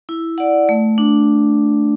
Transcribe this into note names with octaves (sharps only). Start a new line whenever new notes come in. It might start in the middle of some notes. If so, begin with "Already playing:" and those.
E4
D5 F#5
A3
D4